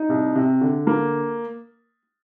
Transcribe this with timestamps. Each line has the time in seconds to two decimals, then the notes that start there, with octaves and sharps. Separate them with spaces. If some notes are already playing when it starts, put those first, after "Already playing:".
Already playing: D#4
0.09 C2
0.35 C3
0.61 D3
0.87 A#3